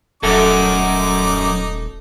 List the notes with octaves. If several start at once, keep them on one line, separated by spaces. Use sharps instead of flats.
D#1 F#2 F#3 A3 D#4 A4 D6